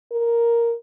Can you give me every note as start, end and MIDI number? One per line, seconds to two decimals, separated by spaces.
0.12 0.74 70